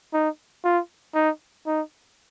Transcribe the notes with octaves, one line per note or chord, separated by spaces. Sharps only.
D#4
F4
D#4
D#4